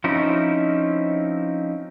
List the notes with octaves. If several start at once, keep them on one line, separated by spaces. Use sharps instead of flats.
F3 C4 C#4 D#4 E4